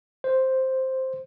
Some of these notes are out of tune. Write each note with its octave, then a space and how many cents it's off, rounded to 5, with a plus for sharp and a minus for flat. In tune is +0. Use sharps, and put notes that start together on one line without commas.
C5 +5